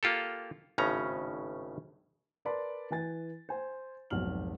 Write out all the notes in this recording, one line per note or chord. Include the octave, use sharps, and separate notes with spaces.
A#3 F4 G4 A4
G#1 A2 C#3 C#4 A#5
A#4 B4 D5 A5 B5 C6
E3 B4 G#5 A6
C5 G#5
F1 B1 G#2 F6 F#7